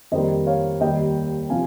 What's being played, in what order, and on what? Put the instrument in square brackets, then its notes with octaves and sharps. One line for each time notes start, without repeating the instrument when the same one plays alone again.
[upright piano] F2 D#3 G3 A#3 C5 D#5
C#5 F5
D#2 D#3 G3 D#5 G5
C3 F3 F5 G#5